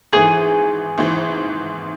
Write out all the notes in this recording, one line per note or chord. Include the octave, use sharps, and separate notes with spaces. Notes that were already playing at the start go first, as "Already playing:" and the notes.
G#1 G#2 E3 G#4
G#1 G#2 E3